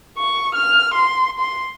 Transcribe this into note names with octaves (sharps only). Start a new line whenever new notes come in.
C#6
F6
C6
C6